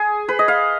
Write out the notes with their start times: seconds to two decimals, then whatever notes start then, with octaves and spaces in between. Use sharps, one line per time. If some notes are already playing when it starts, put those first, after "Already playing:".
Already playing: G#4
0.28 B4
0.39 D#5
0.48 F5